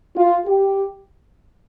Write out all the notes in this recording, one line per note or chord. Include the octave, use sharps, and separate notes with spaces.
F4
G4